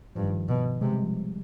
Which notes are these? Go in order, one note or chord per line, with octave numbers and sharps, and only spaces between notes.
G2 F3
D#3
F3
B2
C3 G#3
G3
F3